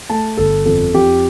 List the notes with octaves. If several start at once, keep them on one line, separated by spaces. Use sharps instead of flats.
A3 A5
G1 A4
F2 A4
F2 G4